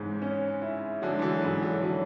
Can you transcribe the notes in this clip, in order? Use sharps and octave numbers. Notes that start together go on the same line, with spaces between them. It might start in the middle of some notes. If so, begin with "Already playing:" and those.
Already playing: G#2 C#3 E3 G#3
C#4
E4
D3 F#3 G#3
E3
D3 F#3
G#2 C#3 E3
D3 F#3
D3 F#3 C#4